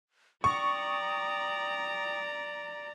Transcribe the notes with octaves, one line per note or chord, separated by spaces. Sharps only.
D5 G5 A#5 C#6 D#6